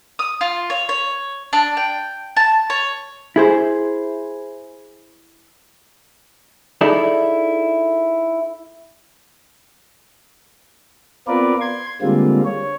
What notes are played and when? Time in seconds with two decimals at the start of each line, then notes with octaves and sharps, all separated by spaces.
0.19 D#6
0.41 F4
0.70 C#5
0.89 C#5
1.53 D4
1.77 G5
2.36 A5
2.70 C#5
3.36 E4 G#4 C5
6.81 D#4 E4 G#4 A4 D5 E5
11.27 B3 C4 F4 A#4 B4 D5
11.61 C6 G#6
12.02 D3 G3 G#3 A#3 C4 F4
12.45 C#5